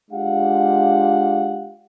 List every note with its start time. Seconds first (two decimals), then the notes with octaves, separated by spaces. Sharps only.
0.11 G#3 D4 F4 G4 F5 F#5